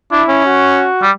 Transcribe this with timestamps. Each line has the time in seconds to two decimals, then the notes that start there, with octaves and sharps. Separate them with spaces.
0.12 D4 E4
0.28 C#4
0.45 F#4
1.02 G3